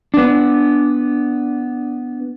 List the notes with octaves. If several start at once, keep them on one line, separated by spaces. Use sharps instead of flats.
B3 D4